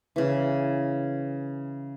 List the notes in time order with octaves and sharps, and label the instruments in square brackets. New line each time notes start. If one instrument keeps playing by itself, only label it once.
[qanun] C#3 E3